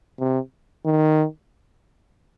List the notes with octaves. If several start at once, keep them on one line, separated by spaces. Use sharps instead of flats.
C3
D#3